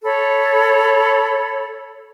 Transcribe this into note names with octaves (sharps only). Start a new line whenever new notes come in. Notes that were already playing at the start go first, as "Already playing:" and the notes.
A4 C#5 B5